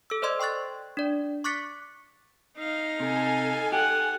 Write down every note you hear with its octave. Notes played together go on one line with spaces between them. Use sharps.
A4 E6
C5 D5 D#5 C6 E6 G#6
G5 C6 C#6 F#6 A6
D4 D5
C#6 D6 F#6 A6 B6 C#7
D#4 F5
C3 A4 G#5
G4 F#5